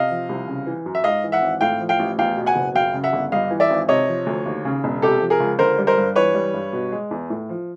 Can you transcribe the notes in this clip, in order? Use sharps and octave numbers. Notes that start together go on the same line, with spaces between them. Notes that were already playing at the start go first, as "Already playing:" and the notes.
Already playing: C3 D#5 F5
F3
C2
C#3
E3
F#2
E5
G#2 D#5 F5
E3
E5 F#5
G#1
A2 F5 G5
F3
F5 G5
A1
E2 F5 G5
B2
F#5 G#5
F#1
F#2 F5 G5
C#3
E5 F#5
G1
G2 D#5 F5
E3
D5 E5
G#1
C3 C#5 D#5
F3
D2
D#2
C#3
E1
C3 G4 A4
F3
G#4 A#4
C#2
D3 A#4 C5
G3
A#4 C5
G2
E3 B4 C#5
G3
G2
B2
G#3
E2
A2
F3